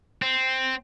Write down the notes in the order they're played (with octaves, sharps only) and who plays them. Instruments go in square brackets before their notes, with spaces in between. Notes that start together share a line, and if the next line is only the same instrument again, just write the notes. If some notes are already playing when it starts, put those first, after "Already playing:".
[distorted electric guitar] C4